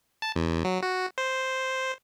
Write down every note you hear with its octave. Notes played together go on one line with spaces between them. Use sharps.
A5
E2
F#3
F#4
C5